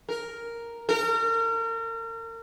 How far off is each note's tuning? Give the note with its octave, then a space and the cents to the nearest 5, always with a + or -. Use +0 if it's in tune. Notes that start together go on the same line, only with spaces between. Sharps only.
A#4 +0
A#4 -35